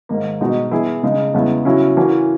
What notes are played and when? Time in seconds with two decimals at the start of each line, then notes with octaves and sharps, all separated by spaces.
0.09 G#2 D#3 A#3
0.41 B2 G#3 D#4 F#4
0.71 E3 B3 E4 G#4
1.03 C#3 G#3 D#4
1.34 E2 C#3 G#3 B3 E4
1.65 C#3 F#3 C#4 E4
1.97 E3 A#3 C#4 F#4